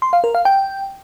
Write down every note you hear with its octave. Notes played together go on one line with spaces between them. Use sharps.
C6
F5
A#4
F5
G5